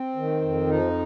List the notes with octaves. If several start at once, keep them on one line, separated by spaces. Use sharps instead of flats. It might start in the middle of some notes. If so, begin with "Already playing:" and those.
Already playing: C4
D#3
F2
F3 D#4